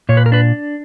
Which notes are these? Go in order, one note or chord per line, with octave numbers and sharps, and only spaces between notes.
A#2 C#5
B4
A#4
D4 B4